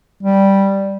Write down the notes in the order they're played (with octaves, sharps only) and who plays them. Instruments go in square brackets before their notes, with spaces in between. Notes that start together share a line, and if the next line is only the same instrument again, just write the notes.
[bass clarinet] G3